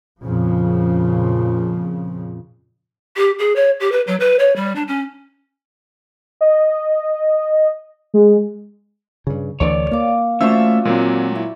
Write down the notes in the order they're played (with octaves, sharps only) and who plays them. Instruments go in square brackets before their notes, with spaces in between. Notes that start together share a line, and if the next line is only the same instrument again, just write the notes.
[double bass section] F2 A#2 C#3 F3
[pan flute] G4
G#4
C#5
G4
B4
F#3
B4
C#5
G3
D4
C#4
[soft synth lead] D#5
G#3
[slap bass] G2 C#3
[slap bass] D2 D3 E3 [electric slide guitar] C#5 D5
[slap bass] A#3 [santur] F5 D6
[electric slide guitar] A3 C#4 [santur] F4 F#4 D5 [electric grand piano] C5 E5 E6
[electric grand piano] A#2 F#3 [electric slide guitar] G#3 C4
[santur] E4